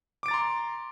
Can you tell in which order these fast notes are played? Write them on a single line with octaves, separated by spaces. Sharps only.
D6 D7 A6 A#5 C6